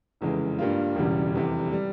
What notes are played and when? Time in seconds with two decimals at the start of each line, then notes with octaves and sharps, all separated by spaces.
0.21 F1 E2 C#3 E3 G#3
0.58 G2 G3 A#3 F4
0.96 E1 E2 C#3 G3
1.33 F1 E2 C3
1.73 G3